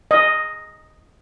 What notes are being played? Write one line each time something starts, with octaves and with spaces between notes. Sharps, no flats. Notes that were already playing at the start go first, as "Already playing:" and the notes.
D#5